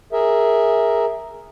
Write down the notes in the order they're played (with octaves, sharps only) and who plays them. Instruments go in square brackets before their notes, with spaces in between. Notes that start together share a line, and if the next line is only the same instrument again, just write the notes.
[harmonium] G#4 A#4 E5